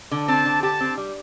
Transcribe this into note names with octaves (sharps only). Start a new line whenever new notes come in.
D3
C4 A5
D3
G4 A5
C4
G3